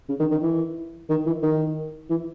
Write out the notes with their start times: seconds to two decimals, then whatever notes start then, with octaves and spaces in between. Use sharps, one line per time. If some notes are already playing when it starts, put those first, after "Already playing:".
0.09 C#3
0.20 D#3
0.31 D#3
0.42 E3
1.10 D#3
1.26 E3
1.43 D#3
2.10 E3